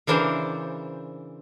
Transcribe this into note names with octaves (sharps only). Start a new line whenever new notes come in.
C#3 E3 D4 A#4 C5